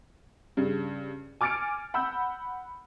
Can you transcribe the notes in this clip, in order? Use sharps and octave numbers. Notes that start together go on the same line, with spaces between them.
G2 C#3
G#5 D6 F6 A6 C#7 D7
F#5 B5 E6 G6